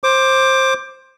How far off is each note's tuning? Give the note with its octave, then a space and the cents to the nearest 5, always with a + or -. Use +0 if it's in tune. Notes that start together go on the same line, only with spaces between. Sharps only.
C5 +15 D6 +10